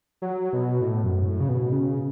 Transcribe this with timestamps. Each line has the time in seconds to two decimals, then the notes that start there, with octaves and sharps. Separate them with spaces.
0.22 F#3
0.53 B2
0.81 A2
1.04 F#2
1.26 A2
1.40 C#3
1.49 B2
1.71 C#3